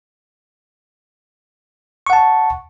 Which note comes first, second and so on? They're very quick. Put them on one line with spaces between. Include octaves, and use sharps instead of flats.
C#6 F#5 A5